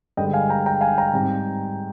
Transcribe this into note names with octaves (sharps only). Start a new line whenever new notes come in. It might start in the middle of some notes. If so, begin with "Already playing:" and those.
G2 D3 G#3 D#5 G5
F5 G#5
G5 A#5
G5 A#5
F5 G#5
G5 A#5
G#2 G3 C4